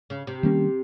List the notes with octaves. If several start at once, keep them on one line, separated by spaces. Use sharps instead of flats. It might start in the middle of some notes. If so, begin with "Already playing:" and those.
C#3
C3
D#3 G3 A#3 C#4